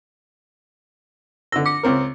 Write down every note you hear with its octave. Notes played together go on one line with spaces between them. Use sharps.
D3 E6 A#6
D6 C#7
C#2 C4 A#4